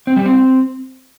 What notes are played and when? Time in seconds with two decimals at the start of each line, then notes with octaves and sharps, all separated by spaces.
0.07 C4
0.16 G3
0.26 C4